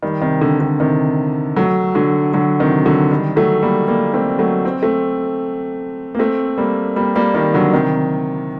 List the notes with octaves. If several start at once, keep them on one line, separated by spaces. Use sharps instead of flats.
D#3 G3
C3 D#3
D3
D3
C3 D#3
F#3 A3
D3 F#3
D3 F#3
C3 D#3
D3 F#3
D#3 G3
F#3 A3
G3 A#3
G3 A#3
A3 C4
F#3 A3
C4
A3 C4
A#3
A3 C4
G3 A#3
G3 A#3
G3 A#3
D#3 G3
D3 F#3
C3 D#3